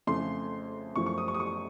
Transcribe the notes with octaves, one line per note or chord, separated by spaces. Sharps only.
F2 C#3 F3 A3 C6
F#2 F3 A3 C#6
C#6
D#6
C#6
D#6
C#6